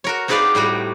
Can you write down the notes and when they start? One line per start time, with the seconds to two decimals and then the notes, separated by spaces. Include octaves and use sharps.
0.04 F#4 A#4 C#5
0.28 C4 D#4 G#4 B4 D5 F5
0.55 A2 G3 A3 F#4